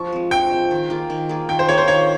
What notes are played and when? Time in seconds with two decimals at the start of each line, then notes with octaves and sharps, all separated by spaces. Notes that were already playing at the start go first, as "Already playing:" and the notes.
Already playing: F3 C#6
0.12 G#3 C4
0.31 F3 G5
0.51 G#3 C4
0.71 D#3
0.90 A#3 F4 G#4
1.10 D#3
1.29 A#3 F4 G#4
1.49 D#3 G5
1.59 C5
1.68 A#3 F4 G#4 C#5
1.78 C5
1.88 D#3 C#5